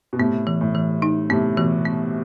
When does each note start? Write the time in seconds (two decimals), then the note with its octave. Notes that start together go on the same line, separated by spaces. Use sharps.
0.13 B2
0.19 A2 C3 B3
0.47 E3
0.61 A2
0.75 E3
1.02 D#4
1.30 A2 C3 B3
1.57 B2 E3
1.85 B3